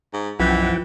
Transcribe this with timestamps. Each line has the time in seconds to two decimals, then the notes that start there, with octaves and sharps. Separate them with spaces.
0.13 G#2
0.39 B1 F#2 E3 F3 F#5 G5